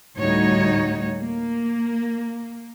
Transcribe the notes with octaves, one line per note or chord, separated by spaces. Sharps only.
D2 A2 G3 D#4 F#4 C#5
A#3